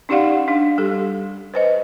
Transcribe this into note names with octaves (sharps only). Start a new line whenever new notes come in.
C#4 D#4 G4 D5 F5 F#5
D4 F5
G3 G4 A4
B4 C5 D#5